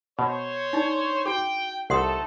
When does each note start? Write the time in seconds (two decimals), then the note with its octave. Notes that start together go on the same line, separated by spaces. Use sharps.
0.19 B2 C5 C#5
0.73 D4 D#4 D5
1.26 F#4 G#4 G5
1.90 C2 A3 D#4 A4 F#5 C6 D#6